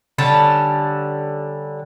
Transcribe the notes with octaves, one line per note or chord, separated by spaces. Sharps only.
D3 G3 C#4 A5